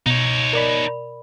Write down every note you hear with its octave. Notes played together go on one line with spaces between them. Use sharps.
B2 D#4 C#5
A#4 D5 B5